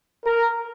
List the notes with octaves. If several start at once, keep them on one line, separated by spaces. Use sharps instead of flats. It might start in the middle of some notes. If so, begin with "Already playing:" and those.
A#4